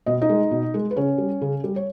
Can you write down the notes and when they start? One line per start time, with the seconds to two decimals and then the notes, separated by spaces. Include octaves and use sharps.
0.06 B2 D#5
0.21 D#4 D#5
0.29 G#3
0.51 B2
0.74 G#3
0.91 B4
0.96 C#3 C#4 C#5
1.18 G3
1.42 C#3
1.64 G3
1.76 C#5